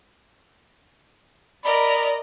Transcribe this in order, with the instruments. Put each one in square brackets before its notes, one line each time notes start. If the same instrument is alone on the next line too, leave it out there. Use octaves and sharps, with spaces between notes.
[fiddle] A#4 [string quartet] D5 D#5 [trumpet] B5